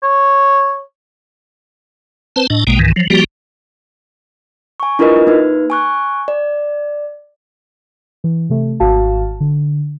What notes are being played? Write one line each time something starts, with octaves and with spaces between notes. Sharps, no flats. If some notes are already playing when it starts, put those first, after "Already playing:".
C#5
C4 B4 C5 A5
A2 D4 D#5
A#1 B2 G#3 A#3 G5
C#2 G#2 D#3 E3
F3 F#3
F3 G3 A#3 F#4 G4
G#5 C#6
D4 E4 F4 A#4 B4 D#5
A#3 D#4 B4
G#5 C#6 F#6
D5
E3
C3 A3
G#1 F#4 F5 A5
D3